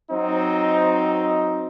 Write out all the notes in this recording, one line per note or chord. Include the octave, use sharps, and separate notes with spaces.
F#3 C4 D#4